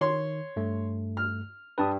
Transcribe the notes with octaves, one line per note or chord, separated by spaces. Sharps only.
D#3 C#5 C6
G2 A3
F6
G2 B4 A5 D#6